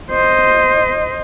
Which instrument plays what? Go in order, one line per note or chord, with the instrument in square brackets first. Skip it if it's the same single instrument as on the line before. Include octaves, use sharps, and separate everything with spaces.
[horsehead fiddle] C5 D#5